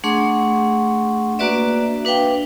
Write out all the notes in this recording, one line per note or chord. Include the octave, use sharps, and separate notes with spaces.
A3 D4 G#4 F#5 C6 C#6
A#3 D4 F#4 B4 D5 E5
D4 B4 F5 G5